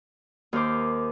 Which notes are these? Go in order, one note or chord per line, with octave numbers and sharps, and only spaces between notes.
D#2 A#4 C5 D6